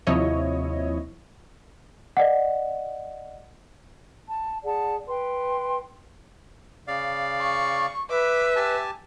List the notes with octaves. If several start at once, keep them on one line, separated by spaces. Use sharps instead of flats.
D#2 C3 F3 E4 C#5 D#5
D5 D#5 F#5
A5
G#4 D5 F#5 A5
B4 G5 C6
C#3 D5 F5
C#6
B4 E5 D6
G4 G#5 A5